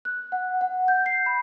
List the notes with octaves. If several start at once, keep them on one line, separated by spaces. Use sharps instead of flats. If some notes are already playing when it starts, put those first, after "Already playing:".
F#6
F#5
F#5
G6
C7
B5